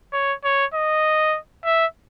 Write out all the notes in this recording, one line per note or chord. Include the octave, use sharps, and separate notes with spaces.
C#5
C#5
D#5
E5